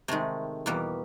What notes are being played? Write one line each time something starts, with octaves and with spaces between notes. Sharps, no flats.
C3 D#3 G#3 A3
E2 B2 G3 A#3